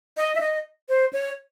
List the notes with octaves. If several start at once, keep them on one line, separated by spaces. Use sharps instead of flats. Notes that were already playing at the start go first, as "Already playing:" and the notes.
D#5
E5
D#5
C5
C#5